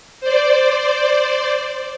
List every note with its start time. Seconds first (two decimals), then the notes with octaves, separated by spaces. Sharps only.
0.20 C5 D5